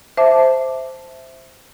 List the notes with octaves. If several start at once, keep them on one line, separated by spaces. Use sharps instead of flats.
C5 E5 A5 D6